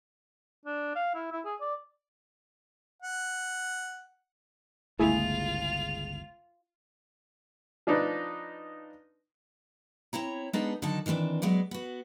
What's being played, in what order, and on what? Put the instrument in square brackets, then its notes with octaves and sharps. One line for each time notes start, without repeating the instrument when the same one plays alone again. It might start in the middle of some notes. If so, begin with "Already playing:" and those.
[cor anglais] D4
F5
E4
E4
G#4
D5
[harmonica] F#5
[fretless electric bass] G1 C#2 [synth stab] A3 E4 G#4 [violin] F4 F7
[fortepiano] F3 D4 D#4 B4
[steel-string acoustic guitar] C4 E4 C#5 A#5
G#3 B3 D4 D#4 G#4 A4
D3 D#3 F#3 D#4 A5
D#3 E3 G3 C4 D4
F#3 G#3 B3 D5
B3 F#4